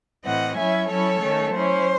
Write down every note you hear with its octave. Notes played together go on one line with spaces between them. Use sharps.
A2 E3 C4 D#5 F#5
F#3 C#4 E4 E5 G#5
F#3 C#4 E4 A4 C#5
D#3 A3 C#4
F#3 C#4 E4 C5